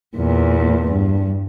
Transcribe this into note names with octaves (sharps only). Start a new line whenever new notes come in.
E2 A#2
G2